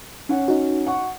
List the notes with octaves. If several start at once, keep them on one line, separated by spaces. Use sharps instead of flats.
C#4 F#5
D#4 F#4
F#5 C#6